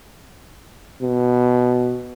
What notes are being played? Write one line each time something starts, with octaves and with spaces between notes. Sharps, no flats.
B2